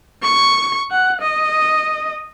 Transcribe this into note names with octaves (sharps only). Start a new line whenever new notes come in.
C#6
F#5
D#5